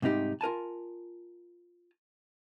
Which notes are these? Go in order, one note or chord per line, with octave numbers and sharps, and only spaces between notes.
G#2 C3 G3 D#4 G4
F4 A#4 G#5 A5